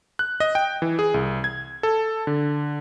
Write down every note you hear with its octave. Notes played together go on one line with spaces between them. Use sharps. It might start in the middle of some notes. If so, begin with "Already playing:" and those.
F#6
D#5
G5
E3
G#4
C2
G#6
A4
D3